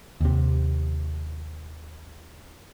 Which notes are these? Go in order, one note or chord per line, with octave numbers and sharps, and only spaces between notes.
D#2 C3